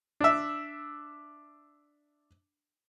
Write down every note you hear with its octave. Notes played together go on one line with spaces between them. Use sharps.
D4 E5